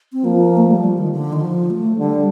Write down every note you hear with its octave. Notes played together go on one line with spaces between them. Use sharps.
C4
F3 A#3
A3
G3
F3
D#3
D3
D#3
F3
A3
D3 G3